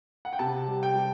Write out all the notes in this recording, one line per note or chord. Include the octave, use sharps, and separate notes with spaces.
F#5
G5
C3 A5
G3
G5
G3